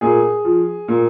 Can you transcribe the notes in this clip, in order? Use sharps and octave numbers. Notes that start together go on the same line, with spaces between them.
A#2 G#4
F3
A#2